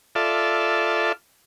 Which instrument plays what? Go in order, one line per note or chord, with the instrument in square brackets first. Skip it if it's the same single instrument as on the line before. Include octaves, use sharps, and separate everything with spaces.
[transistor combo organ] F4 A4 D5 E5